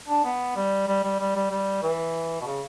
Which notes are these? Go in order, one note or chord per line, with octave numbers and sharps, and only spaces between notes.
D4
B3
G3
G3
G3
G3
G3
G3
E3
B2
C#3